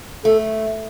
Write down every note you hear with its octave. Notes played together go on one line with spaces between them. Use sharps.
A3 A4